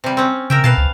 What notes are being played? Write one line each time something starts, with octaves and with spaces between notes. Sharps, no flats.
C3 G3
C4 C#4
C#3 A#4 E5 G5
B2 B4 F5 A5
C#2